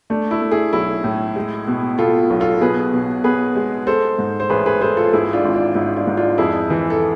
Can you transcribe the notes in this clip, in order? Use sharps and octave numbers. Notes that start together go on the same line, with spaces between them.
A3 D4
E4
A3
E4 G#4
B1 E4 G#4
A2
G#3
B2
B2 F4 A4
B1
F4 A4
B2 G#4 B4
B2
B3 G#4 B4
G#3
G#3 A4 C5
G#2
C5
A1 G#4 B4
G#4 B4
G#3 A4 C5
F4 A4
G#2 E4 G#4
D4 F4
G#1
D4
G#2 E4
D4 F4
G#2
D4 F4
F2 E4 G#4
E3
A4